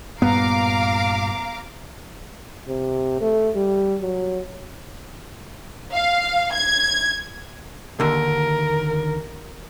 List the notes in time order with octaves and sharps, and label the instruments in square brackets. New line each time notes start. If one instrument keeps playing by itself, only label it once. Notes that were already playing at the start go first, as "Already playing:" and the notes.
[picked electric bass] G2 A#2 [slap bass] B3 [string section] F5 A#5 D6
[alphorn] C3
A3
G3
F#3
[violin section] F5
G#6
[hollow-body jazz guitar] D#2 D3 [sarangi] A#4